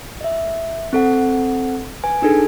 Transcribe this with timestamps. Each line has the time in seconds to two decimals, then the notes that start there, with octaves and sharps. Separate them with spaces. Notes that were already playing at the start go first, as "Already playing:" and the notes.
0.21 D#5 E5
0.93 C4 A4 F#5
2.04 B4 G#5
2.22 D4 D#4 G#4 A4